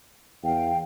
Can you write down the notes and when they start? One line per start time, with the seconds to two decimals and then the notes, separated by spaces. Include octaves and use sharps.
0.44 E2 F5 G5